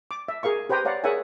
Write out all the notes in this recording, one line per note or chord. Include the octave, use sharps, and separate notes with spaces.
D6
E5
G#4 A#4 F5 C#6
G4 B4 C5 G5 A#5 D#6
C#5 D5 F5 F#5 A#5
G#4 A#4 C#5 E5 F#5 G#5